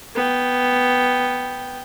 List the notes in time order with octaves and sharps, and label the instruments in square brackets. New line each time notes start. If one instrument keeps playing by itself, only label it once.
[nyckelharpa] B3 G5